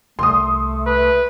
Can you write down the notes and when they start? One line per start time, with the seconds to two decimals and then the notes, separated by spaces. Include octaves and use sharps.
0.19 C2 A3 C6 D#6
0.87 B4